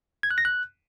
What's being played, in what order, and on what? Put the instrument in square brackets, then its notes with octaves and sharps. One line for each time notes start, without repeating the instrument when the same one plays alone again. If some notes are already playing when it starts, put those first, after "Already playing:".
[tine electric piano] G#6
F#6
A#6
F#6